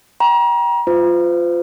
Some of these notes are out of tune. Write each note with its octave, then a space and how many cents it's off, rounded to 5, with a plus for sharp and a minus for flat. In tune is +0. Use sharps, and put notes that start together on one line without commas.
G5 +0 A#5 +35
F4 +0 C5 -40